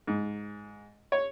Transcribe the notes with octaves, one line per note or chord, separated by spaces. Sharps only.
G#2
C#5